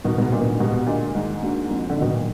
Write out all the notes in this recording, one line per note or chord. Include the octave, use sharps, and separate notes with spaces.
D2 B2 D#3
G#2 B2
A#2 D3 F#3 B3 D#4
B2
A#2
D#2 G#2 B2
A#2 D3 G#3 D#4 F#4
G#2 D#3
A#3 D4 F#4
F2
D3
B2 D#3 F#3
A#2